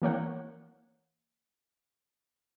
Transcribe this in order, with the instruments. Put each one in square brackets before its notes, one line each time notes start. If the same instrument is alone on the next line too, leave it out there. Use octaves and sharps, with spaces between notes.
[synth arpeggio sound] E3 A#3 C#5 F#5